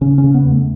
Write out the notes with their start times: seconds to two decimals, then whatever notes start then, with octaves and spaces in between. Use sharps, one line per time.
0.01 C#3 C#4
0.18 C#4
0.24 C#3
0.34 B3
0.46 E2
0.51 A3